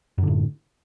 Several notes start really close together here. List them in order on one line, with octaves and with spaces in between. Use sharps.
F#2 D3 A2